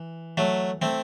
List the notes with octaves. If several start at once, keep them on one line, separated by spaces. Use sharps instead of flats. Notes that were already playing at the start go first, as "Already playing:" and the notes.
Already playing: E3
F#3 A3
A3 C4